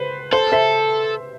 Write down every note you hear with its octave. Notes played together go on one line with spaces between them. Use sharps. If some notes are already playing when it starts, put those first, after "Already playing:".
Already playing: B4 C5
A4 C5
C5 E5